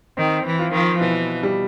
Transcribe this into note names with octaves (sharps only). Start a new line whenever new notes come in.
D#3 C4
E3
F4
D#3 F3
B2 E3
G3